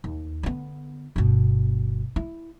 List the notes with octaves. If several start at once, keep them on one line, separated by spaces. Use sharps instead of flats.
D#2
D3 B3
G1 B2
E4